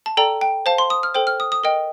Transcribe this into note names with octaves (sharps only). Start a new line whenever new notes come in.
A5
A4 D5 G5 A#5
G5
C5 F5 A5
C6
D#6
F6
A4 C5 G5
F6
D#6
D#6
A#4 D#5 G5